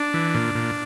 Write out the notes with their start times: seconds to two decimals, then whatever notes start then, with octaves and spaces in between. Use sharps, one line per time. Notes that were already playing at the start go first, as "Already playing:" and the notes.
Already playing: D4
0.14 E3
0.34 A#2
0.55 A#2